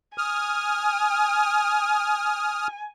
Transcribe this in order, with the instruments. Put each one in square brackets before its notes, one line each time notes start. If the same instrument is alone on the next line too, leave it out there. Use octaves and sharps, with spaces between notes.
[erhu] G#5 [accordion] D#6 F6